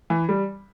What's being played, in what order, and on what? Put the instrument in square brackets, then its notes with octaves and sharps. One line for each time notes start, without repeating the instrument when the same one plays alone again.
[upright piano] E3
G3